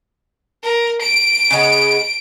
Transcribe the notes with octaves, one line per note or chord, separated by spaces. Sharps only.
A#4
D7
C#3 G#3 B3